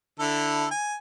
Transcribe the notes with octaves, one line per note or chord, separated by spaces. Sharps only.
D3 E4 A4
G#5